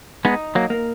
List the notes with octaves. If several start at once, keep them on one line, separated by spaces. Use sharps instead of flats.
G#3 B3 D#4
F#3 A#3
A#3